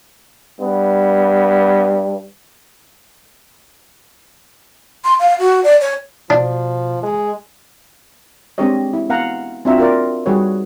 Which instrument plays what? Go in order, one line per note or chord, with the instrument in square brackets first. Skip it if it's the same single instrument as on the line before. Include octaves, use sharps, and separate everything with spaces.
[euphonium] G2 [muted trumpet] B3
[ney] C6
F5
F#4
D5
C#5
[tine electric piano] B2 [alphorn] F3 [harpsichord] D4
[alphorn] G#3
[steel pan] G#3 C4 D4 G4 C#5 D#5
E4
B3 F5 F#5 A#5
C4 D4 F4 F#4 E5 A#5
F4 A#4 D5
G3 D#4 F#4 G#4 B4 C#5